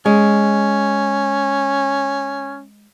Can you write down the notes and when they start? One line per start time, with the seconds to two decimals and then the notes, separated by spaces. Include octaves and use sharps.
0.06 G#3 C#4